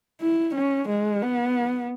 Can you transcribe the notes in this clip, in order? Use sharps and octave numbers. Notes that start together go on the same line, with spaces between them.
E4
C#4
G#3
B3